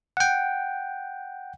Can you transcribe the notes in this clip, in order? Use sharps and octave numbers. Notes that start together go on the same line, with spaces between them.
F#5 G5